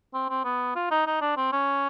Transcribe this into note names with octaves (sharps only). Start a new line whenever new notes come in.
C4
C4
B3
F4
D#4
D#4
D4
C4
C#4